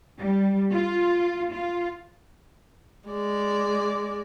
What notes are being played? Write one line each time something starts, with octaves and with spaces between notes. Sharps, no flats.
G3
F4
F4
G#3 D5